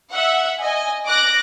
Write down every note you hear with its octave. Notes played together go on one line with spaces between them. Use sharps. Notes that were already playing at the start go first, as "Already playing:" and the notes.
E5 F#5
D#5 G#5
D6 F#6 A#6